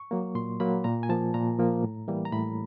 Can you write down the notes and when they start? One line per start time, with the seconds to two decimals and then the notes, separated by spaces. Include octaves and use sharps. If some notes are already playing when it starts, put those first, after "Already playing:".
Already playing: C#6
0.11 F#3 A#3
0.35 A#2 C6
0.60 F#3 A#3 B5
0.84 A#2 A#5
1.03 G#5
1.09 F3 A#3 A5
1.34 A#2 A#5
1.58 F3 A#3
1.83 A2
2.08 E3 G3 A#3
2.25 A#5
2.32 A2 B5